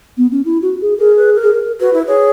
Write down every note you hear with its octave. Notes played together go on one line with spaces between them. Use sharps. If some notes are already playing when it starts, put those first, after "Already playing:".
B3
C#4
E4
F#4
G#4
G#4 A#4
B4
A#4
G#4
A#4
F#4 B4
E4
G#4 C#5